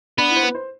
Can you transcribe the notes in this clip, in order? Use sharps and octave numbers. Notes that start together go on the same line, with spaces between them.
B3 D4
E4
C5
B4
C5